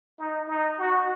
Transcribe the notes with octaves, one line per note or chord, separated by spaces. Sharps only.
D#4
D#4
F#4